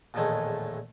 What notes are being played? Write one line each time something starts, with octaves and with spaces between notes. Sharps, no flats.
A#1 E2 A2 D#3 G#3 A3